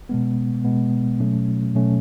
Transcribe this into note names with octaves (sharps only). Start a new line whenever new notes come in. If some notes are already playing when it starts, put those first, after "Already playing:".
B2 G#3 B3
B2 G#3 B3
B2 F#3 A3 C#4
B2 F#3 A3 C#4